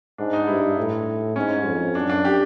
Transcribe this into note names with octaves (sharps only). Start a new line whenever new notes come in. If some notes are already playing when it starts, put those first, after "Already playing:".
G#2 D4
D#4
G2 E4
A2
G#2 C#4
F2
F#2 D4
D4
G4